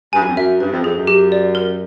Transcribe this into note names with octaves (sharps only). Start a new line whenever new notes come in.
G2 G#5
F#2
F2
F#2 E5
G2 B4
F2
F2 G#4
F#2
G4
D5
A#4